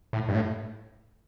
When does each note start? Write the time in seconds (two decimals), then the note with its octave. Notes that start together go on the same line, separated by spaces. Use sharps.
0.13 A2
0.29 G2
0.34 A2